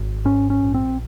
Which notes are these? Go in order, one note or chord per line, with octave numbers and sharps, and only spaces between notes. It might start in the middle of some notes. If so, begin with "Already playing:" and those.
Already playing: G#1
G#2 C#4
C#4
A#1
C4